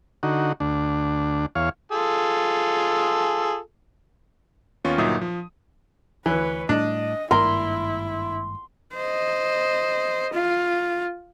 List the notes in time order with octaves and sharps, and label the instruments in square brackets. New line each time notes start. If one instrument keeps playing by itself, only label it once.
[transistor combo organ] D3 D#4 F#4
D2 D4
E2 C#5 F5
[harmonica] F4 G#4 A4
[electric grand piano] D#2 B3 C#4 F4 C#6
G1 A#2 F#3 D#4 E5 D#6
F3
[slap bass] D2 [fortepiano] E3 [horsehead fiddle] B4 C#5
[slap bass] A2 G3 [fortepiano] D4 [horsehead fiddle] D#5
[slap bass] G#1 G2 A#3 [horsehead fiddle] E4 [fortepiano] A#4 [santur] C6
[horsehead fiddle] C5 D#5
F4